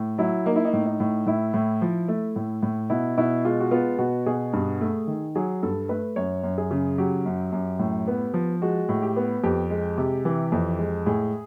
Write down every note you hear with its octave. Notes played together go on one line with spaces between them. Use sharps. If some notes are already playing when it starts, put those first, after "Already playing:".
Already playing: A2
F#3 E4
A#3 D#4
E4
D#4
A2
D#4
A2
A2 E4
A2
F3
A3
A2
A2
B2 E4
B2 E4
G#3 F4
F#4
B3 F4
B2 F#4
B2 G#4
G2
A3
D#3
F#3 G#4
G2 A4
A3 B4
F#2 C#5
F#2
G#4
C#3
F#3 G4
F#2
F#2
A2
B3
F3
G#3 F#4
A2
G4
B3
F2 G4
G#3
C3
E3
F2
G#3
A2 G#4